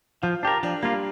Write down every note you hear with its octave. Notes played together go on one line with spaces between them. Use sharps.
F3 F4
D4 G4 A#4
F3 D4
G3 A#3 F4